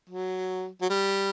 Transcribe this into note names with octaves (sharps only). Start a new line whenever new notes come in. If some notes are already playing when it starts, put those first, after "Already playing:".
F#3
F#3
G3